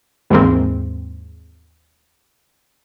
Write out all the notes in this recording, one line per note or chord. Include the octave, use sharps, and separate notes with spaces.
D#2 G#2 E3 G#3 A#3 C4